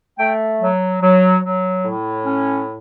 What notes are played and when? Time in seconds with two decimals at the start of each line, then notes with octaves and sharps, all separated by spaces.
0.19 A3 G5
0.61 F#3
1.02 F#3
1.42 F#3
1.84 A2
2.25 C#4